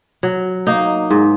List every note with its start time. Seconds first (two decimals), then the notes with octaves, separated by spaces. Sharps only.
0.23 F#3
0.67 A#3 D#4
1.11 G#2